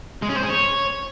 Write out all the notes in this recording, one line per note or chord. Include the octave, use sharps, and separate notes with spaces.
G#3
C#4
C5
G#4
C#5